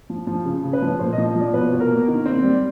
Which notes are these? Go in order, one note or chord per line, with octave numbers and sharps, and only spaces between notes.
F3
F3
C#3
C#3
B4
F3
A#2 C5
D#5
F3
F3 D5
B2 B4
B2
A#4
A#3
D#3
C4
G3